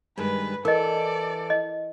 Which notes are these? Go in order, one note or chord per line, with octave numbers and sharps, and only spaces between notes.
G2 D#3 G#3 B4
E3 A4 A#4 D5 D#5
D#5